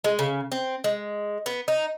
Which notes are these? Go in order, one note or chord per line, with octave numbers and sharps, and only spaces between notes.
G#3
C#3
C4
G#3
B3
D#4